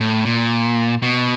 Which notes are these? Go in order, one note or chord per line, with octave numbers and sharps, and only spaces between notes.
A2
A#2
B2